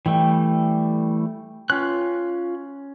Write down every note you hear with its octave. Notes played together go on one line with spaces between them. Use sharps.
E3 G3 A3 G5
C#4 F4 F#6